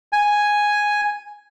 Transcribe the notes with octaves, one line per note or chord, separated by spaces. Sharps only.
G#5